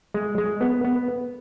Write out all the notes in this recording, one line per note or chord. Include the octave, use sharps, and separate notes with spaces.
G#3
G#3
B3
B3